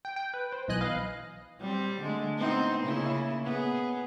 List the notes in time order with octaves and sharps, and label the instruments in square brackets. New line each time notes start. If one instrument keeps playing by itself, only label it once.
[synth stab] G5
G5
B4
C5
B1 B2 E3 D#5 G#5 F#6
B4 D#5 F5
[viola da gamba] G3 C4
D3 G#3 A3
B3 C4 D#4
C#3 A#3 E4
B3 G#4